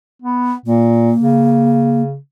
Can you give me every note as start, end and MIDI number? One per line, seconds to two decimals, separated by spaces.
0.22 0.53 59
0.66 1.12 46
0.66 2.02 58
1.19 2.17 49